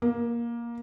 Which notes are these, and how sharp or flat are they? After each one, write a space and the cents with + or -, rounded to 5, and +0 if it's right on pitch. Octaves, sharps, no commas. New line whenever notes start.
A#3 +15